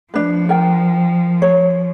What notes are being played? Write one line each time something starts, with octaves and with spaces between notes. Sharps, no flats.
F3 D4 B4
A#4 G5
C#5